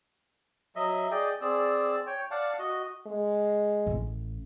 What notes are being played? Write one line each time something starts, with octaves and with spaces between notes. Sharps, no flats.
F#3 D#5 E5
G#4 D5 D#5 G5
C4 G#4 D5 E6
C#5 G5
D5 F5 F#5 A5
F#4 D#5
G#3
A1